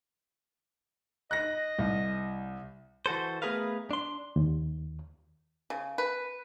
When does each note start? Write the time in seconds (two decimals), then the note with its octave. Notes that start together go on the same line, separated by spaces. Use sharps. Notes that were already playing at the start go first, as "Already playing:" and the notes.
1.31 D#5 F#6 A#6
1.78 C2
3.06 E3 F#4 A4 C5
3.42 A3 B3 G#4 A#4 B4 F5
3.91 D4 C6
4.36 D#2
5.70 C#3
5.98 B4